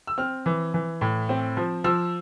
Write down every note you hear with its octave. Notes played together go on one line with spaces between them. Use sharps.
E6
C4 F6
E3
E3
A2
C4
F3
F3 E6